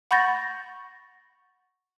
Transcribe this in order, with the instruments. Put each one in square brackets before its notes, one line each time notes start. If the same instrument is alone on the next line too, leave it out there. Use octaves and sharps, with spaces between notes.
[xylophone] F#5 B5 C#6 G6 A6 A#6